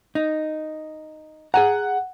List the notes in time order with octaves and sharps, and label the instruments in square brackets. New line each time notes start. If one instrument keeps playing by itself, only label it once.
[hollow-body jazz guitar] D#4
[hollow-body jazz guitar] G#4 G#5 A#5 [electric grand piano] F#5